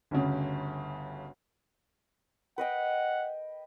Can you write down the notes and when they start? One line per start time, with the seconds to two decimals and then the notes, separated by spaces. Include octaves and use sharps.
0.11 G1 D2 C#3
2.58 B4 D#5 F#5 G5